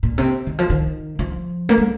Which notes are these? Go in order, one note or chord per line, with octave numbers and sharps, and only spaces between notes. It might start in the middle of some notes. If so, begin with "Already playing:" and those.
A#2
C3
D#3
F3
D#3
F3
A#3
G#3